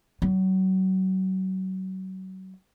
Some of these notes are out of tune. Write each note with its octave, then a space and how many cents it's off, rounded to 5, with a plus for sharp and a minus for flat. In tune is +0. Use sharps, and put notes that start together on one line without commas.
F#3 +30